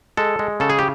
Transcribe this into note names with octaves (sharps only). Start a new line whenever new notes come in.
G#3 A4
G#3
C#3 A4
G#4
G4